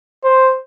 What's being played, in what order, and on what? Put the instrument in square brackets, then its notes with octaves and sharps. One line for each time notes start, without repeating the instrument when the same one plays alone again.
[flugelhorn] C5